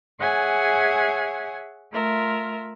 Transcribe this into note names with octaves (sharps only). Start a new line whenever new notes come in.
G#4 C#5 E5 F#5 G#5 G#6
A3 F4 A#4 E5